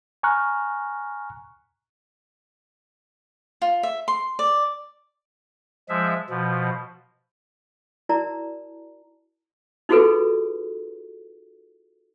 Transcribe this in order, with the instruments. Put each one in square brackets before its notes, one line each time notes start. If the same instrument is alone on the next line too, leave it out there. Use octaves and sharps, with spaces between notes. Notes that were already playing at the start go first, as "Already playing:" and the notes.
[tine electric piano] G#5 A#5 C#6 F6 F#6
[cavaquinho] F4
E5
C6
D5
[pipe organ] F3 G#3 E5
B2 F3
[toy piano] E4 F#4 A#4 D5 A5 A#5
D#4 F4 F#4 G#4 A4 B4